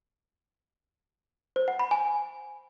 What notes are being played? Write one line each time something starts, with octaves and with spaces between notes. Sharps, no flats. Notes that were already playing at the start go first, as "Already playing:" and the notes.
C5
F#5
B5
G#5